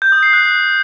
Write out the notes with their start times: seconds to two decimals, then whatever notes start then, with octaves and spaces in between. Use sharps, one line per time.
0.02 G6
0.12 D#6
0.23 C7
0.33 F#6